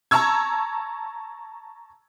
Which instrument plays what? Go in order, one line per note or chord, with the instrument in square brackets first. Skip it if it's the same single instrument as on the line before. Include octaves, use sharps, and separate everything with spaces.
[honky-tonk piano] A5 A#5 C#6 E6 G#6